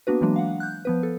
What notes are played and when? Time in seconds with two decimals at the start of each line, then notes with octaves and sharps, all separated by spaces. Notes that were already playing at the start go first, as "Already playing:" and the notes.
0.07 A#3 B3 D4 F#4 B4
0.21 E3 F#3 G#3 A#3 D4
0.36 F5 F#5
0.60 F#6 G6
0.85 F3 B3 B4
1.03 A4